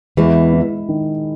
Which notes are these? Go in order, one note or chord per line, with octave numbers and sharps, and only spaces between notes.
E2 E3 G#3
E4
D#3